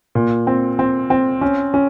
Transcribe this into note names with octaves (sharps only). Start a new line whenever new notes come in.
A#2
C4
C4
C4
C#4
C#4